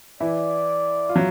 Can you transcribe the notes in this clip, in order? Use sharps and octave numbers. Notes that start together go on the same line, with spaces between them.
E3 E4 D5
F4
F#3